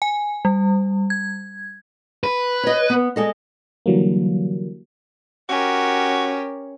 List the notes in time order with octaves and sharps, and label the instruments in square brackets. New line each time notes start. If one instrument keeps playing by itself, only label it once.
[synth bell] G#5
G3
G#6
[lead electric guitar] B4
[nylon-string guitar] C#5 D#5
B3
G#3 A4 D#5
[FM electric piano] D3 E3 F#3 G3 A#3
[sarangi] C#4 [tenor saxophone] F#4 [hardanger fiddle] G4 A#4